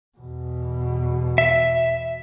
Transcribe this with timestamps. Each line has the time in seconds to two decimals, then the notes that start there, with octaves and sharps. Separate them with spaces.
0.18 E2 B2
1.38 E5